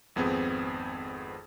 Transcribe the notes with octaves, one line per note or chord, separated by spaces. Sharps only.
G#1 F2 B3 C4 G#4